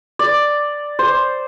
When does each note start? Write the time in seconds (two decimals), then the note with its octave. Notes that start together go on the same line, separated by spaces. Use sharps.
0.19 D5
0.99 C5